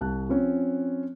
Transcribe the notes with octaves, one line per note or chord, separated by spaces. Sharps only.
C2 A5 F#6
F3 C4 C#4